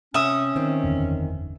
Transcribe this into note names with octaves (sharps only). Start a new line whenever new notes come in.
C3 C#4 E5 D#6
D#3 C4
F#1 E2 D3